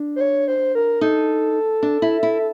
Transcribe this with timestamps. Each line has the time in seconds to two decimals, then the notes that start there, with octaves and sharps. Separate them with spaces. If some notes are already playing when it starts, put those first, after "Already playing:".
Already playing: D4
0.16 C5
0.21 C#5
0.48 C5
0.75 A#4
1.01 D#4 A4
1.83 D4
2.02 E4
2.23 E4